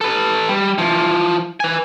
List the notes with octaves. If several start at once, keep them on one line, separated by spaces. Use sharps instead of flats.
A4 B4
G3
E3 F3
B4 G#5